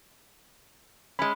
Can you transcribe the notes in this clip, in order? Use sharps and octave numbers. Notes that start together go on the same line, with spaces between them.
G#3 C#4 B5